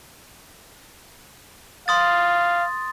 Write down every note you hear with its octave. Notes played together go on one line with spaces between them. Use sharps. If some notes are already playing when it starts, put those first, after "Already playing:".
F5 C6 D#6 A6